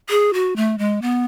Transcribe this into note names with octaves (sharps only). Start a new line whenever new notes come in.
G#4
F#4
A3
G#3
B3